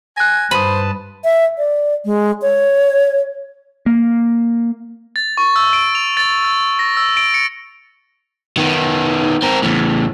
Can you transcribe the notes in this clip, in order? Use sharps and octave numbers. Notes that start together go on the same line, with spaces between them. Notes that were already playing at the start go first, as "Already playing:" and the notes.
G#5 F#6 A#6
G2 B4 C5 A5 B5 D#6 D#7
E5
D5
G#3
C#5
A#3
A6
C#6
E6
D7
F7
A6
E6
A#6
E6
D7
C#7
D#3 B3
C4 A#4
E2 A2